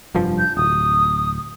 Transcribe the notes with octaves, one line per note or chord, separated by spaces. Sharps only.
F1 G2 F3
G6
D1 D#6